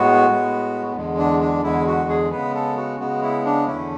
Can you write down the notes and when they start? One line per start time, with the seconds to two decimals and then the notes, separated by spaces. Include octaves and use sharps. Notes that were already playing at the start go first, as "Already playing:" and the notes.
Already playing: A2 G#3 B3 F#4
0.29 A2 G#3 B3
0.96 E2 D3 G#3
1.18 D4
1.41 D4
1.64 E2 D3 G#3 E4
1.87 F#4
2.09 G#4
2.32 C#3 G#3 B3 B4
2.55 A4
2.77 F#4
3.00 C#3 G#3 B3 F#4
3.22 E4
3.45 D4
3.67 E2 D3 A3 C#4 E4